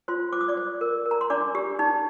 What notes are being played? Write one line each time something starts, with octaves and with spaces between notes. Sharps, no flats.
F4 C5 C6
C5 D6
D#6
D5 D6
C5
A#4
A#4
A#5
C6
D4 D5 D6
G4
D#4